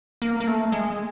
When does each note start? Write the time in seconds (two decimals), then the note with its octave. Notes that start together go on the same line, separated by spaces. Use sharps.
0.22 A#3
0.40 A#3
0.47 A3
0.72 G#3